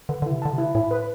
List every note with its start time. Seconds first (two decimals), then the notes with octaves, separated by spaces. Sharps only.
0.09 D3 B4
0.22 D3
0.26 C3 E4
0.42 D3 A5
0.53 C3
0.58 E4
0.75 A2 E4
0.91 B4